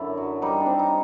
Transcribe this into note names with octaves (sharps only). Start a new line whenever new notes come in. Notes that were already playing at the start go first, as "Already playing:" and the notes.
Already playing: F#2 D3 E4
F#3
G3 D#4
D4
C4
D#4